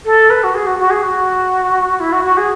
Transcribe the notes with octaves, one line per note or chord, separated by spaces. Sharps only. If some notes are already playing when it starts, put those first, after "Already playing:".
A4
B4
F#4
G#4
F#4
F#4
G#4
F#4
E4
F#4
F#4
G#4